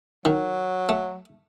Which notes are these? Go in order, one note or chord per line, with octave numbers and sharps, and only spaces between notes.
D#3 F#3
A3